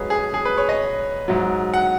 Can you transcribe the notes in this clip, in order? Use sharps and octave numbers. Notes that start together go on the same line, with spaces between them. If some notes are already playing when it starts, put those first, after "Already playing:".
Already playing: G#2 F#3 G#4 B4 C#5
G#4
G#4
B4
C#5
D#5
G#2 F#3
F#5